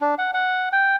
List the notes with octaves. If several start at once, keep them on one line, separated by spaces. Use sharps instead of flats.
D4
F#5
F#5
G5